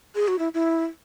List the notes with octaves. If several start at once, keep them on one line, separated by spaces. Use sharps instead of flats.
G#4
F#4
E4
E4